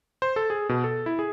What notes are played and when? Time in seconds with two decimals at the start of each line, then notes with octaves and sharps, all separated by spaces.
0.22 C5
0.36 A4
0.50 G#4
0.69 B2
0.84 A4
1.06 E4
1.19 G#4